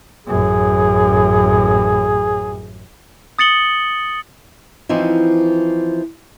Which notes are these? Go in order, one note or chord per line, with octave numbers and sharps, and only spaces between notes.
A1 F#2 G#4
D#6 A6 C#7 F#7 G7
E3 F3 C4 D#4